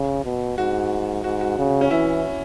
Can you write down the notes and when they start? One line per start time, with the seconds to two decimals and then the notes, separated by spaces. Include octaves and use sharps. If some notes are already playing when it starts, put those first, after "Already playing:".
Already playing: C#3
0.24 B2
0.58 G#2 F#4
1.24 G#2 F#4
1.41 F#4
1.58 C#3
1.81 C#4
1.91 E3 E4